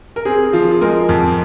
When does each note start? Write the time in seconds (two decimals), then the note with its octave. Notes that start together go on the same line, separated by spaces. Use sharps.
0.16 A#4
0.25 C4 G#4
0.53 F3 F4
0.71 F4
0.81 G#3 A#4
1.09 F2